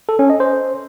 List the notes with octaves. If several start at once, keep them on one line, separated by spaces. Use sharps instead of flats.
A4
C#4
D#5
C5